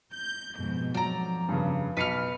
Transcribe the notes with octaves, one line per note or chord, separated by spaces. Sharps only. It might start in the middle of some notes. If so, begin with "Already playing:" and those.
G6
F2 G#2 B2
F2 F#3 D5 A#5
G2 C#3
B1 B4 F6 C#7 F7